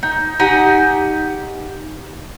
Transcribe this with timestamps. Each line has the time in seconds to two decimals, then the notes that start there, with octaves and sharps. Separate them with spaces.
0.03 D#4
0.40 D#4 G4 F#5 G#5